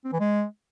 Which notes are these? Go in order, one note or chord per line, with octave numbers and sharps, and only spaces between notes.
C4
E3
G#3